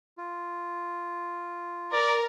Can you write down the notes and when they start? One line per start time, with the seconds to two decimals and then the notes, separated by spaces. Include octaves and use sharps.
0.18 F4
1.93 A#4 D5